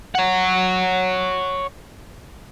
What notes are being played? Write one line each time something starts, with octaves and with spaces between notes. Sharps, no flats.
C#5 F#5